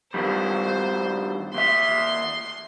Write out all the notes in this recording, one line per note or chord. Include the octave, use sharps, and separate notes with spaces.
G2 D#3 G3 C5
D#2 E5 C6